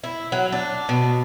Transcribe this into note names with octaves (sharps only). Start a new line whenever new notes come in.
E4
F#3
D4
B2